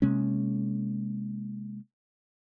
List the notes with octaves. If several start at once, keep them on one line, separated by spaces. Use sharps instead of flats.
C3 G#3 A#3 C#4